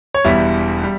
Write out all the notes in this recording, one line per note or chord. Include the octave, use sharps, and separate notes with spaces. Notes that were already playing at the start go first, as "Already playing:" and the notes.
C#5
E1 E2 E3 G3 E5
G3